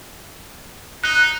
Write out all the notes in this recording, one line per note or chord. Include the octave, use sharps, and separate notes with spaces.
D#4 F#6